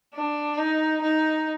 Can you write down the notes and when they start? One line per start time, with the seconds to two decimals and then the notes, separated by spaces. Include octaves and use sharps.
0.14 D4
0.57 D#4
1.02 D#4